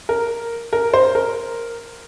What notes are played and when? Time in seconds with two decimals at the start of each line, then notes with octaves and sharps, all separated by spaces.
0.09 A#4
0.73 A#4
0.94 C5
1.15 A#4